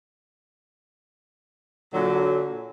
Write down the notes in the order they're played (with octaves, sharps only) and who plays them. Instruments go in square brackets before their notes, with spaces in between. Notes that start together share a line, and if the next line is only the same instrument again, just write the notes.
[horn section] A#2 D3 F#3